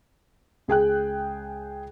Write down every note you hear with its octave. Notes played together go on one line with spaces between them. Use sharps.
C#2 G#4 G5 F#6